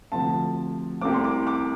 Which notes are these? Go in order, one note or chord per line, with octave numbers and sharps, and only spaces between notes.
D2 C3 F3 A5
C2 C3 A3 C4 D6
C6
D6
D6